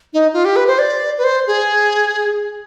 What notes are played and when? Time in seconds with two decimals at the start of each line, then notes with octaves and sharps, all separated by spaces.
0.13 D#4
0.34 F4
0.45 G4
0.56 B4
0.67 C5
0.79 D5
1.18 B4
1.24 C5
1.47 G#4